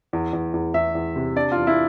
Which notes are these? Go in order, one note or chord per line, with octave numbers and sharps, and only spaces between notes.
E2
E2
E2
E2 E5
E2
C3
D4 D5
F4
E2
E4